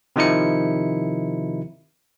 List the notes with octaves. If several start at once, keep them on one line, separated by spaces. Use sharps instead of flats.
C3 D#3 F3 D#4 E4 C#7